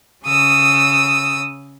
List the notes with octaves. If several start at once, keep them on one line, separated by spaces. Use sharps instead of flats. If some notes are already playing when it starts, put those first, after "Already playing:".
C#3 D#6 E6